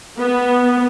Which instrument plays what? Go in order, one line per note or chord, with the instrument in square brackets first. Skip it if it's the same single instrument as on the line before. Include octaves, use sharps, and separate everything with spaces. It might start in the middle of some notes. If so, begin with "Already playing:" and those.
[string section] B3